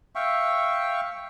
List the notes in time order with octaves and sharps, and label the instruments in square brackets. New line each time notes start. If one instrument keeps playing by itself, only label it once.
[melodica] E5 F5 G5 C#6